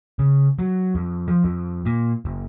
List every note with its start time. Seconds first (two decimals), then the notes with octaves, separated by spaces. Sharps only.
0.19 C#3
0.59 F#3
0.95 F2
1.28 F3
1.44 F2
1.85 A#2
2.25 F#1